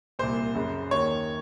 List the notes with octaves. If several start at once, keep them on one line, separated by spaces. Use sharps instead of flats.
C2 A#2 C5
F#2 C#3
D#2 D#3 C#5